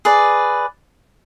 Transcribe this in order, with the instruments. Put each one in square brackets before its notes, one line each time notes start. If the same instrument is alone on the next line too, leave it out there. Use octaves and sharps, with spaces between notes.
[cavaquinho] G#4 B4 D5